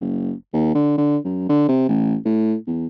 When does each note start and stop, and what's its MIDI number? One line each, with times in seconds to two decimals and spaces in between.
0.01 0.33 30
0.54 0.74 39
0.75 0.93 50
0.98 1.17 50
1.25 1.46 42
1.49 1.64 50
1.69 1.87 48
1.88 2.17 33
2.25 2.56 45
2.67 2.87 40